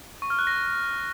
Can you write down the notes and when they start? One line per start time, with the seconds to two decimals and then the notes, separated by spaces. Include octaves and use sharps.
0.22 C#6
0.30 F6
0.39 F#6
0.47 A#6